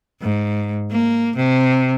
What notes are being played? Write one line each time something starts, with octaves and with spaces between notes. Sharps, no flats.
G#2
A#3
C3